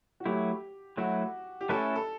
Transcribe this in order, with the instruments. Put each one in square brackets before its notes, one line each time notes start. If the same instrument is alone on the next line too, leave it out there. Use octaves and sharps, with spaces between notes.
[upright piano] F#4
[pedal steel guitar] F#3 A3 E4 [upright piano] G4
[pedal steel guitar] F#3 A3 E4 [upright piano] F#4
[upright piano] G4
[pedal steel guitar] A3 C#4 E4 B4 [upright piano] A4
[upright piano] A4